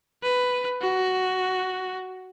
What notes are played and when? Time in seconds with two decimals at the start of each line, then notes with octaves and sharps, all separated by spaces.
0.23 B4
0.82 F#4